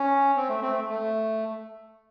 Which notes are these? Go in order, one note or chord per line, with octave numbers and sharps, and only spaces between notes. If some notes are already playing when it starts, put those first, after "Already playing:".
Already playing: C#4
C4
A3
C4
A3
A3